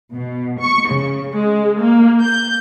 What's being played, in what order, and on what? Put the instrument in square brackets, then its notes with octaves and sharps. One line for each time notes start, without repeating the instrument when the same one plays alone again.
[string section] B2
C#6
C#3
G#3
A#3
G6